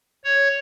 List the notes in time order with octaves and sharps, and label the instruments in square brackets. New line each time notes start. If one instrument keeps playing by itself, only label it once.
[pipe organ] C#5